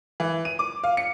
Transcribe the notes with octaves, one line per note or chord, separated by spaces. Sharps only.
E3
D#7
D6
F5
C#7